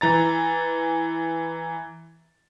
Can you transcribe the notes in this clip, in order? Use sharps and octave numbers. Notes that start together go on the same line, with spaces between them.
E3 A#5 A6